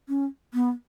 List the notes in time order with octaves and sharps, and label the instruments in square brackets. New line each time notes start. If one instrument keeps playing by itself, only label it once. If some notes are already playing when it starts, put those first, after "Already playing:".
[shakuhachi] C#4
B3